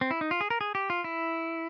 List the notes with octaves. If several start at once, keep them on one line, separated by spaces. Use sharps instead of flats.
C4
E4
D#4
F4
G#4
A#4
G#4
G4
F4
E4